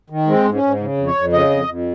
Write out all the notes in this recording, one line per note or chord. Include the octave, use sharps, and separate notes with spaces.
D#3
G#3 C4
G#2
C#4
G#2
C#3
F2
C#5
F2
C#3 D#5
F2
F2